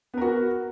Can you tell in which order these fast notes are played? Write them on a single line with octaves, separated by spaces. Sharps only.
B3 A#4 F#4